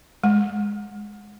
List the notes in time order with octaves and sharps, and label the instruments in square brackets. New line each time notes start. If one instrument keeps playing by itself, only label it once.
[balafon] G#3